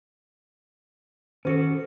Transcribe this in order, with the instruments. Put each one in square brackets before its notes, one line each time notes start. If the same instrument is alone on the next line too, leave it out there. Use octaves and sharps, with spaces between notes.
[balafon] D#3 C5 [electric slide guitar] C#4 F#4 A4